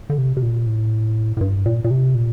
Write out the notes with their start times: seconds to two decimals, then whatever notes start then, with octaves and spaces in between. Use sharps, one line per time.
0.10 D3
0.18 C3
0.37 C3
0.42 A#2
0.67 A2
1.37 A2
1.41 G2
1.66 A#2
1.84 A#2
1.91 C3
2.15 A#2